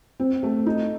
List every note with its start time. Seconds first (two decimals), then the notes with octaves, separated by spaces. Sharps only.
0.20 C4
0.43 A3
0.66 D#4